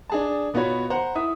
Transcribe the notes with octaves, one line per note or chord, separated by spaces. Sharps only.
D4 G#4 A5
B2 B3 F4 F#4 C#5 B5
C5 F#5 A#5
E4 E5 D#6